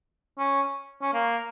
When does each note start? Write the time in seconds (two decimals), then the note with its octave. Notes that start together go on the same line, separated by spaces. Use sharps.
0.38 C#4
1.02 C#4
1.14 A#3